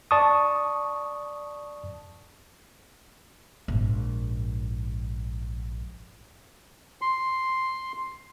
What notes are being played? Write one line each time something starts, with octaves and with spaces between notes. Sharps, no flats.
D5 A5 C#6 D#6
A#1 G#2
C6